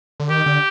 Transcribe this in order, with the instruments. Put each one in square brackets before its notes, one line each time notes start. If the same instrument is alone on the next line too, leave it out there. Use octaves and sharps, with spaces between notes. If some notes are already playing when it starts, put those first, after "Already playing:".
[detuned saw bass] D3
[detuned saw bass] D#3 [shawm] G4
[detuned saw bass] D3